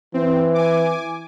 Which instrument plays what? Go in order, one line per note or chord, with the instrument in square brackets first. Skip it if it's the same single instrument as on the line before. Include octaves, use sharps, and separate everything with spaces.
[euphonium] E3 [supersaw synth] C4
[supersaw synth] G#5 D6